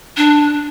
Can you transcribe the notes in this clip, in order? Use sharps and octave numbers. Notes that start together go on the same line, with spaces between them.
D4